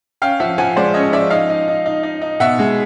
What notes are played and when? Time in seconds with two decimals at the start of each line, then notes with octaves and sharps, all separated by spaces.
0.22 C#4 F5 G5
0.40 F3 E5 F#5
0.58 F3 F#5 G#5
0.77 G#3 C5 D5
0.94 C#4 C#5 D#5
1.13 F3 D5 E5
1.30 D#4 D#5 F5
1.50 D#4
1.68 D#4
1.86 D#4
2.03 D#4
2.22 D#4
2.40 B2 E5 F#5
2.59 G#3